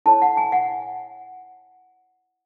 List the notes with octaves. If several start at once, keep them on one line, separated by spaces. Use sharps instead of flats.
E4 A4 C#5 A5
F#5
G#5
F#5